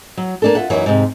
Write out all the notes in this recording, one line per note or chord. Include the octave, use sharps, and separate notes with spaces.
F#3
A#3 D4 A4
F4 E5 F#5
F#2 E3 F#3 A#3 D#4
G#2 C3